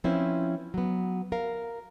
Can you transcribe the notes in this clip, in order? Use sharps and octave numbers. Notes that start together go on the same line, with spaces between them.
F3 C4 C#4 E4 B4
F#3 B3
A#4 F5